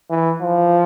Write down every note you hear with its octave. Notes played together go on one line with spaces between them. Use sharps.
E3
F3